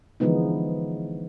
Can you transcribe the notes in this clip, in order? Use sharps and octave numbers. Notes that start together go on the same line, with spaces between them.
D3 E3 F3 G#3 B3 D#4